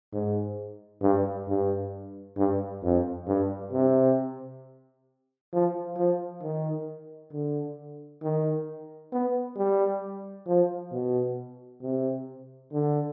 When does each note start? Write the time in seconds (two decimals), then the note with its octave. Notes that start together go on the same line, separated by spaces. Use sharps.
0.13 G#2
1.02 G2
1.48 G2
2.37 G2
2.83 F2
3.27 G2
3.72 C3
5.53 F3
5.97 F3
6.42 D#3
7.33 D3
8.23 D#3
9.13 B3
9.57 G3
10.47 F3
10.92 B2
11.82 C3
12.72 D3